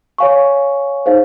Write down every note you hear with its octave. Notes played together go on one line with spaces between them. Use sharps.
C#5 F5 G#5 C#6
D#4 G#4 C5 F5